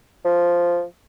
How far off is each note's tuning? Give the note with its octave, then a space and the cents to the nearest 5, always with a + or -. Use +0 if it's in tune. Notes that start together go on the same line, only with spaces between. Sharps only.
F3 -5